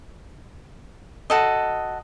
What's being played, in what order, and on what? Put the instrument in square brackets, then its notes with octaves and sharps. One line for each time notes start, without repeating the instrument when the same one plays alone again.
[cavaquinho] F#4 A4 D#5